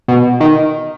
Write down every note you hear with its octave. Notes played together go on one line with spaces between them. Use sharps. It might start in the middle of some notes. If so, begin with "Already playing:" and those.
B2
D#3